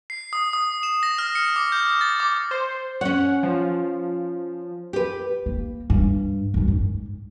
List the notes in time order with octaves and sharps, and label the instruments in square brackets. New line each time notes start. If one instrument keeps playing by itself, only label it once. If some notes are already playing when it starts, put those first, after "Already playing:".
[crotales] C7
D#6
D#6
E7
A#6
F6
C#7
D6
G6
A6
D6
[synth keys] C5
[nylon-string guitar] C#4 C#5 [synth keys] F#5
[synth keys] F3
[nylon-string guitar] G4 B4
[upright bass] A#3
G2
F#2 G3
G#2